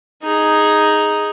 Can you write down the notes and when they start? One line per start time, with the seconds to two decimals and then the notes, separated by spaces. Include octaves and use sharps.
0.23 D#4 G#4